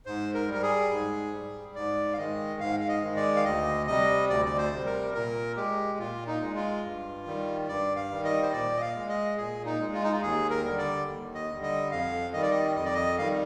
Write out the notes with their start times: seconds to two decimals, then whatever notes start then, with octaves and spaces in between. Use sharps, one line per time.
0.06 G#2 C5
0.34 A#4
0.48 G3
0.54 A#4
0.63 G#4
0.91 G#2
1.33 G3
1.75 G#2 D5
2.13 F5
2.17 D#3 G#3 D#5
2.60 G#2 F5
2.80 F5
2.88 D#5
3.02 D#3 G#3
3.16 D5
3.36 F5
3.44 D2 D#5
3.87 C3 G3 D#5
4.29 D2 D5
4.45 D5
4.57 C5
4.72 C3 G3
4.86 A#4
5.14 A#2 A#4
5.56 G#3 G4
5.98 A#2 F4
6.27 D#4
6.41 G#3
6.55 F4
6.83 G2
7.26 D#3 G3
7.68 G2 D5
7.96 F5
8.10 D#3 G3
8.24 D#5
8.43 C5
8.52 A#2 D5
8.77 D#5
8.81 F5
8.95 G#3
9.09 D#5
9.37 A#2 G#4
9.65 D#4
9.80 G#3
9.94 F4
10.03 D#4
10.12 F4
10.22 D#2 G#4
10.50 A#4
10.64 D3 G3
10.78 D5
11.07 D#2
11.34 D#5
11.49 D3 G3
11.63 D#5
11.91 F2 F5
12.33 D#3 G3 D#5
12.42 D5
12.51 D#5
12.76 F2 D#5
12.85 D5
12.94 D#5
13.18 D#3 G3 F5